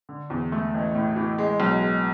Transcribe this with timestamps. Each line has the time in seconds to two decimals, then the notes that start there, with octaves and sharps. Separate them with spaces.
0.09 D3
0.30 E2
0.52 A3
0.74 A1
0.95 A2
1.16 E3
1.38 G#3
1.60 B1
1.81 G#3